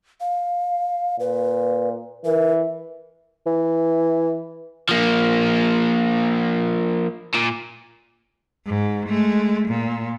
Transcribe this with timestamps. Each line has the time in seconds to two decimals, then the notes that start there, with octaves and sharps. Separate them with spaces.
0.21 F5
1.20 A#2 B4
2.25 E3 A#4
3.47 E3
4.89 F3 A#3
7.35 A#2
8.66 G#2
9.08 G#3 A3
9.69 A#2